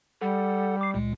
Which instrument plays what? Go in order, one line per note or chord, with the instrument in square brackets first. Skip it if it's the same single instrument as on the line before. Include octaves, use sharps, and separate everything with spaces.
[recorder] G3 [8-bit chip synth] A4 F#5
[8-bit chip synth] D6 C7
C#2 A#2 G#3